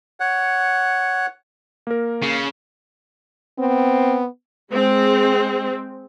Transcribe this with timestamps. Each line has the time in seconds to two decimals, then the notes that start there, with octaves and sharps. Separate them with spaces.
0.20 C#5 F#5
1.87 A#3 A#4
2.23 C#3
3.59 B3 C4
4.73 G#3 C4